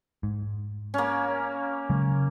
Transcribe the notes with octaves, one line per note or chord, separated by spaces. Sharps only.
G#2
A#3 C#4
C#3 F#3 G#3